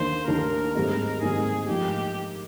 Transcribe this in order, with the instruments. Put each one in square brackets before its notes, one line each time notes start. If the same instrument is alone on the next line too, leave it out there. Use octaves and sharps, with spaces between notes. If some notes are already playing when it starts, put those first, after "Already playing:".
Already playing: [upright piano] D#2 D#3 A#3 D4 [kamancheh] C5
[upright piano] D#2 D#3 A#3 D4 [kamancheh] A#4
[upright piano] G#2 D#3 G3 C4 D#4
[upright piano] G#2 D#3 G3 C4 D#4 [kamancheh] G#4
[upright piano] G#2 F3 A#3 D#4 [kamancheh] G4